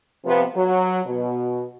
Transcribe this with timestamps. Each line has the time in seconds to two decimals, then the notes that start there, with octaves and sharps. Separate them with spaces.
0.24 C3 F3 B3
0.55 F#3
1.06 B2